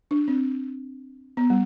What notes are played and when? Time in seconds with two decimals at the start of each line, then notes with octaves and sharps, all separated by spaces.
0.11 D4
0.28 C4
1.37 B3
1.50 G3